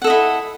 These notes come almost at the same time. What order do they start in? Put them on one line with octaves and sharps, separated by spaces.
F#5 A4 D#5 E4